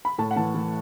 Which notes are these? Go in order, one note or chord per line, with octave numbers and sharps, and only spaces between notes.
B5
A2 A5
F#5
E3 A5
E3